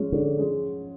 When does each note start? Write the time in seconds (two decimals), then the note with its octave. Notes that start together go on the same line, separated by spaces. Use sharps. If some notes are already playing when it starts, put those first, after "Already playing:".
Already playing: G#2 F3 G#3 C#4
0.12 G#2 D3
0.38 F3 G#3 C#4